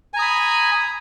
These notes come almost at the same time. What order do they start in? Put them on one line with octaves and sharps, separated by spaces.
G#5 A#5 D#6 B5